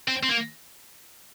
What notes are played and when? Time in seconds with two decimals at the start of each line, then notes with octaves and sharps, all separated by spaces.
0.08 C4
0.23 C4
0.29 A#3